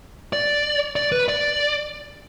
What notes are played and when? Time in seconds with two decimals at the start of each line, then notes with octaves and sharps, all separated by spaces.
0.33 D5
0.96 D5
1.12 B4
1.28 D5